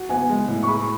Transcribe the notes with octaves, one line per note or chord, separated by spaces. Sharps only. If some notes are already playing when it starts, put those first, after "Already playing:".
Already playing: F#4
B3 G#5
G#3
A2
C#6
G#4 B5